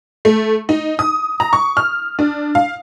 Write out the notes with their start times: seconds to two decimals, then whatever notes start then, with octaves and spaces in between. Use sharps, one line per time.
0.25 A3
0.69 D#4
0.99 D#6
1.40 A#5
1.53 C#6
1.77 F6
2.19 D4
2.55 F5